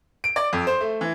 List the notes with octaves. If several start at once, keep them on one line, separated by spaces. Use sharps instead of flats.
D7
D5
F2
C5
A3
E3